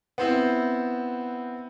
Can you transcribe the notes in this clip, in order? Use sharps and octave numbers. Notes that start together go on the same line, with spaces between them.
B3 C4 E4